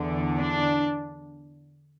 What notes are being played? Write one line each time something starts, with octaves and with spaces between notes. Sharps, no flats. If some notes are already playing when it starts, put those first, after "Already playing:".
Already playing: E2 D3
D4